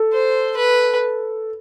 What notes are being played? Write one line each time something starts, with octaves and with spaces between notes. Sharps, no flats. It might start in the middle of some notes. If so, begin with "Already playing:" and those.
Already playing: A4
C5
B4